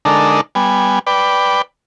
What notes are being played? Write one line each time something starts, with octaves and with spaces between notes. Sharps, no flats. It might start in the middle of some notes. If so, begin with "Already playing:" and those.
D3 G#3 D4 D#4 A4 A#4
G3 B3 G#5
B4 D5 G5